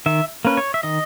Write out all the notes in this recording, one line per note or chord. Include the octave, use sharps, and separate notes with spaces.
D#3 E5
A#3 C#4 B4
C#5
E5
D#3 D#5